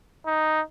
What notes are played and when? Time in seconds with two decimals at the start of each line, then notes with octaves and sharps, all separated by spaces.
0.26 D#4